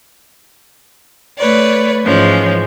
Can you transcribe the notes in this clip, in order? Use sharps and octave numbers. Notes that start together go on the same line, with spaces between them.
A3 B4 C#5 D5
G#2 E3 F3 G#3 C#4